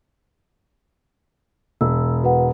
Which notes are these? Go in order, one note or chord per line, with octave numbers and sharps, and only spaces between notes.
E1 E6
F#4 B4 F#5